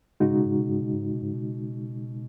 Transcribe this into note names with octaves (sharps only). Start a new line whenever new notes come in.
G#2 C#3 G#3 D#4 F#4
B2
G#2
B2
G#2
B2
G#2
B2
G#2
B2